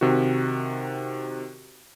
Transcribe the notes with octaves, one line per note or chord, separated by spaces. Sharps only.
C3 D#3 F#4